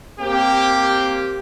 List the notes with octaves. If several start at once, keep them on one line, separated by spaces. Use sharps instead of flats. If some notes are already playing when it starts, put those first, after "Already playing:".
A#3 C4 G4